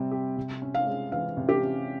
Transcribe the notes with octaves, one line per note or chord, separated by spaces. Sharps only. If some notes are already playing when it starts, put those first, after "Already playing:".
Already playing: C3 G3 C4
G4
C3
C#4
F5
G#3
E3 F5
C3
G4
C#4